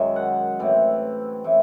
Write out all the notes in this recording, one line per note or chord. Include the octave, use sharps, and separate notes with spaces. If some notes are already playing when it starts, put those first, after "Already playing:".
Already playing: F#2 D#3 G#3 C#5 E5
F#5
A2 E3 C4
A2 E3 C4